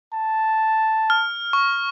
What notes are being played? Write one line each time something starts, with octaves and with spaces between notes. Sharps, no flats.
A5
F6
C#6